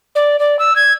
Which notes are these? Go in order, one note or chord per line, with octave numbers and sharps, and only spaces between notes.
D5
D5
E6
G#6